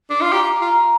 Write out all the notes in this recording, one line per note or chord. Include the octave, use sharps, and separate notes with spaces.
D4
F4
G4 A#5
F4